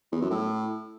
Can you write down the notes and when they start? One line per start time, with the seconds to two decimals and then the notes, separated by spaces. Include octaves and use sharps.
0.12 E2
0.21 F#2
0.31 A2